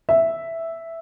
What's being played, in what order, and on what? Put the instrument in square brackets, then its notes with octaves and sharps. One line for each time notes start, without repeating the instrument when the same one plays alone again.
[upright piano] E5